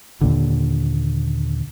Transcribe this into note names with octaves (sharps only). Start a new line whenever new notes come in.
D#2 A#2 D3